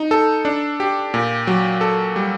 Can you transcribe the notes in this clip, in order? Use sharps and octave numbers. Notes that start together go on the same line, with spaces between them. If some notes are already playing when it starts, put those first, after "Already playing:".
Already playing: D#4
A4
D4
G4
A#2
F#3
A4
G3